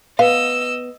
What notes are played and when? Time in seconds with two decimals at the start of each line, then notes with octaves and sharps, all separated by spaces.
0.19 B3 D#5 F5 E6